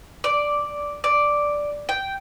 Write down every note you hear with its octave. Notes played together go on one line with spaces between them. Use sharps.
D5
D5
G5